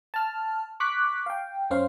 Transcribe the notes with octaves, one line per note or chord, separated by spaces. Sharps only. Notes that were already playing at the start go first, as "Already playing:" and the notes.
A5 F6
C#6 D6 F#6 B6
F5 G5
F#2 C#4 C5 F5